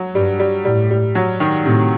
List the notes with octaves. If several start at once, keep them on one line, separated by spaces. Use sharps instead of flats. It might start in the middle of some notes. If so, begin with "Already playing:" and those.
Already playing: F#3
G2 G3
G3
A2 G3
G3
F#3
D#3
A2 C3